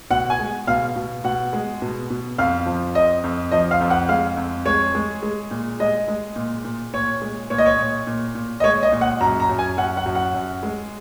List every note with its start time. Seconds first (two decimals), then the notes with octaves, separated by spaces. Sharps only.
0.11 B2 F#5
0.30 G#5
0.40 G#3
0.67 B2 F5
0.96 B2
1.24 B2 F#5
1.53 G#3
1.82 B2
2.10 B2
2.38 F2 F5
2.66 F3
2.95 F2 D#5
3.24 F2
3.51 F3 D#5
3.71 F5
3.81 F2
3.90 F#5
4.09 G#3 F5
4.37 F2
4.65 G#3 C#5
4.95 G#3
5.23 G#3
5.51 A#2
5.80 G#3 D#5
6.08 G#3
6.36 A#2
6.65 A#2
6.94 A#2 C#5
7.22 G#3
7.50 A#2 C#5
7.58 D#5
7.66 C#5
7.79 A#2
8.07 A#2
8.35 A#2
8.60 D#5
8.64 G#3 C#5
8.83 D#5
8.92 A#2
9.01 F#5
9.21 F#2 A#5
9.40 A#5
9.49 F#2
9.59 G#5
9.77 F#2 F#5
9.97 F#5
10.06 F#2
10.15 F#5
10.34 F#2
10.63 G#3